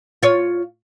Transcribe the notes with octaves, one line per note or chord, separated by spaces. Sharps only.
F4 C#5